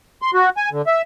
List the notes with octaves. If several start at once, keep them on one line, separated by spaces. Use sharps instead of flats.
C6
F#4
G#5
D3
E5